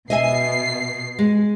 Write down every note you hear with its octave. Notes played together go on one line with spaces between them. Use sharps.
B2 D#5 E5 G#5 C7
G#3